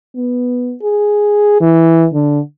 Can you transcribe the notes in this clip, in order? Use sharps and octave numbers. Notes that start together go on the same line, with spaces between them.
B3
G#4
E3
D3